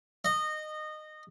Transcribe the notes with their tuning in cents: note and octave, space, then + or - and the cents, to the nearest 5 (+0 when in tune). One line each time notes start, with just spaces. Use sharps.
D#5 -20